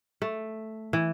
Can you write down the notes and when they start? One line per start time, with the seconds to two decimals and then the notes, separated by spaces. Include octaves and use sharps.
0.22 A3
0.93 E3